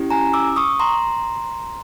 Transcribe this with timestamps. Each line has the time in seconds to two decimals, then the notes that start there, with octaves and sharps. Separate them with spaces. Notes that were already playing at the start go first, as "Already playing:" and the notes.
Already playing: C#4 E4 G4
0.10 G#5 A#5
0.33 D6 E6
0.56 C#6 D#6
0.80 A#5 C6